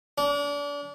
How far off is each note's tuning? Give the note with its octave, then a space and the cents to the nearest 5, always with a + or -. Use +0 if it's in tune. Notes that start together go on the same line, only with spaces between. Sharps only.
D4 -35